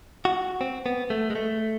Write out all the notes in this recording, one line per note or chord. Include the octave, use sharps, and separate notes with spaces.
F#4
C4
B3
A3
G#3
A3